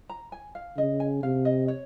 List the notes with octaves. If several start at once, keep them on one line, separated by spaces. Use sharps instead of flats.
A#5
G#5
F5
C#3 D#5
G#5
C3 F5
D#5
C#5